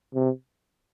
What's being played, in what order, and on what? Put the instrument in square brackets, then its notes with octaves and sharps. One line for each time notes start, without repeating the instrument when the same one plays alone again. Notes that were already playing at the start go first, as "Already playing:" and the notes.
[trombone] C3